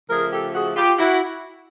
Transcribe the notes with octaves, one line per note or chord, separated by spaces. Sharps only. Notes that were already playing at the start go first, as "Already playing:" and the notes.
C#3 F3 A3 G#4 A#4
G4 A4
F#4 G#4
F4 G4
E4 F#4